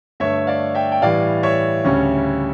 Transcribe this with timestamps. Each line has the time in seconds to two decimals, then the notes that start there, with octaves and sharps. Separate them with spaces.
0.20 G2 D3 A3 C#5 E5
0.47 D5 F5
0.75 E5 G5
0.92 G5
1.01 A2 E3 G3 D5 F5
1.43 C#5 E5
1.84 D2 C#3 G3 C#4